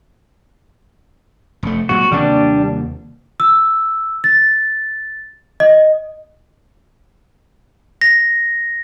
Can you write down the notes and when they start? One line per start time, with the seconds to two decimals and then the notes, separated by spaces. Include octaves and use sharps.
1.63 F1 A3
1.89 A#2 F#3 G#3 F#4
2.12 D#2 C3 G3 A#3 D4
3.40 E6
4.24 A6
5.60 D#5
8.01 A#6